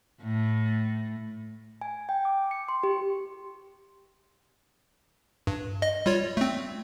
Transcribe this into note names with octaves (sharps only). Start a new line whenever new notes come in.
A2
G#5
G5
D6
C#7
C6
G4
G2
D#5
G3 F4 C#5
A3 C4